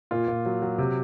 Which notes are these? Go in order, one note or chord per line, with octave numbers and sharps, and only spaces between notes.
A#2 F4
A#2
F#3
F#3
C3